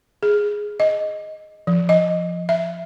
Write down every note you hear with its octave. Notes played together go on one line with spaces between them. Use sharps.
G#4
D#5
F3
D#5
E5